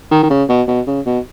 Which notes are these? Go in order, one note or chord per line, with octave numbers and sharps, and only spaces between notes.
D#3
D#3
C#3
B2
B2
C#3
B2